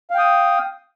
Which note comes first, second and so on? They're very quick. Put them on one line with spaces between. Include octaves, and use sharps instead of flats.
F5 G5 D#6